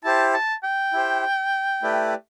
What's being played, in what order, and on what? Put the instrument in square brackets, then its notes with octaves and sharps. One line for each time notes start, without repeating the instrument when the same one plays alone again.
[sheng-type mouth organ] E4 G4 C5 [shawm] A5
[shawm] A5
G5
[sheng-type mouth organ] E4 G4 C5
A3 E4 G4 B4 D5